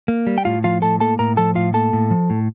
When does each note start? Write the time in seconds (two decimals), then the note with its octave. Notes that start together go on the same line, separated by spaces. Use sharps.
0.08 A#3
0.27 G3
0.38 G5
0.45 A2 F4 F5
0.64 F3 F4 F5
0.82 A2 A4 A5
1.00 A#3 A4 A5
1.19 A2 A#4 A#5
1.37 F3 A4 A5
1.55 A2 F4 F5
1.74 A#3 A4 A5
1.93 A2
2.11 F3
2.30 A2